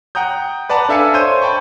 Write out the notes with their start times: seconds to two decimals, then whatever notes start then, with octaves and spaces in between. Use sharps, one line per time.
0.15 F#5 G5 A#5 D#6 G6
0.69 B4 D5 F#5 A5 A#5
0.89 D4 A4 E5 F5 G#5 C#7
1.14 C5 C#5 G6 D#7
1.42 G5 A5 B5 C#6